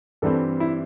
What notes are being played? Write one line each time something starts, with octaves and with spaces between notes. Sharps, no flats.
G2 E3 G3 C4 A4
E4